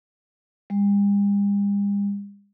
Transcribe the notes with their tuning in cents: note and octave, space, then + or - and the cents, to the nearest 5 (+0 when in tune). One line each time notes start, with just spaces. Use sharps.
G3 +45